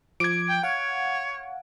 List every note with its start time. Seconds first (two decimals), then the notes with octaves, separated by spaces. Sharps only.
0.20 F3 D6 G#6 D7
0.49 G5
0.63 C#5 F5 F#5